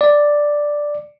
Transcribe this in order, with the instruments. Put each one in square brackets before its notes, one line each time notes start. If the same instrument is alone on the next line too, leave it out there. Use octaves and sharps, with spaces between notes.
[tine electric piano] D5